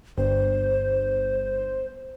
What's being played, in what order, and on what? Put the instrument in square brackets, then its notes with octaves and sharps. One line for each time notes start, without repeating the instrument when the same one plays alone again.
[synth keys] G1 [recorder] C5